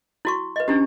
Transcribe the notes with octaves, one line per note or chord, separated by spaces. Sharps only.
E4 F#4 C#6
B4 D#5
C#4 D4 E4 G4